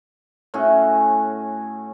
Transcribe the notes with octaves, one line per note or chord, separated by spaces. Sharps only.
A2 C#4 F#4 G#4